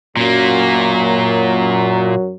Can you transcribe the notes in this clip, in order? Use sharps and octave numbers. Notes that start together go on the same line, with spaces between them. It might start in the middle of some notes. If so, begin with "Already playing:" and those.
F#2 A#2 F#3 A#3